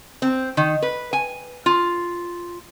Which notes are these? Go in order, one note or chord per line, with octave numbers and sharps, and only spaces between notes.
C4
D#3
B4
G#5
F4